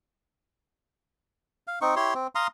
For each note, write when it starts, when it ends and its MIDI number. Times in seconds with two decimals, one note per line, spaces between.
1.67 1.79 77
1.81 1.95 60
1.81 1.95 63
1.81 1.95 85
1.96 2.14 64
1.96 2.14 67
1.96 2.14 73
1.96 2.14 84
2.14 2.27 60
2.35 2.47 77
2.35 2.47 82
2.35 2.47 84
2.35 2.47 87